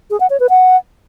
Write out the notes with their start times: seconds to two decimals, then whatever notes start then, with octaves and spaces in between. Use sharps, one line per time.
0.10 G#4
0.20 F#5
0.30 C#5
0.40 B4
0.50 F#5